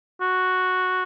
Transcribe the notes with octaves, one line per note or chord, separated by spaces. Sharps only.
F#4